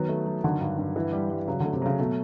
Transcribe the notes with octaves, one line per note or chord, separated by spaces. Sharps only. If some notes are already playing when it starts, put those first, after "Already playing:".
Already playing: D#3 F#3 B3
A3
F#3
D3 D#3
G2
G2
E3
G3
G3
C#3 F#3
D3 A3
C3
C#3 F#3
B2 A3